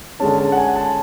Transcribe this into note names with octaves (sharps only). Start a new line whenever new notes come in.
D3 G#3 C#4 A5
A5
F#5
G#5
A5